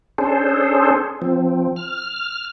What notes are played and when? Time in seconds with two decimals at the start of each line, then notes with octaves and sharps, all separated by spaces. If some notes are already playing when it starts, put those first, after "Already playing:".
0.18 C#4 D4 G#4 A4 C5
1.22 F3 C4
1.76 F6